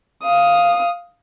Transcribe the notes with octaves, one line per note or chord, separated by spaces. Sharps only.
F5 D#6